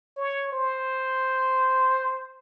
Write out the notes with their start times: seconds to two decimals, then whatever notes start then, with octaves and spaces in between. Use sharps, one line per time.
0.17 C#5
0.52 C5